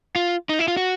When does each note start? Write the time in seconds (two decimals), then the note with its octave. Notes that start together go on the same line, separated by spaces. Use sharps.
0.16 F4
0.49 D#4
0.59 E4
0.68 F4
0.77 F#4